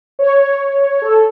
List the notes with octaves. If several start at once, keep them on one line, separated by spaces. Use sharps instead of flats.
C#5
A4